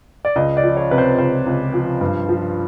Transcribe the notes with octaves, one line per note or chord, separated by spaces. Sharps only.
D5
C#2 D#5
D5
F3
C#5
C3 B4
C5
C#2 C5
C#2
F3
G2
F3